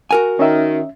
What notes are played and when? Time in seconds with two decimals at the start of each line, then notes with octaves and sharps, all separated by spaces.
0.11 F#4 A#4 G#5
0.39 D#3 C#4 E5